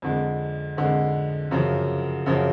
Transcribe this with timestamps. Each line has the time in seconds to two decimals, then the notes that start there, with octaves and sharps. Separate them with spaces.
0.02 F2 D3 G#3
0.77 F2 D3 G#3
1.51 F#2 C#3 F3
2.26 F#2 C#3 F3